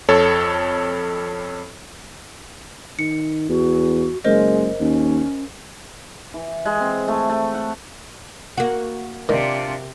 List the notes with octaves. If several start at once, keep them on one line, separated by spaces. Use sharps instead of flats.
F2 A4 C#5
D#3 C#7
E2 F#4
F#1 G#3 A#4 C5 D#5
D#2 C#4
E3
G#3
C4
A3
A3
F#5
A#3 F#4
C3 D#3 D4 F4 D5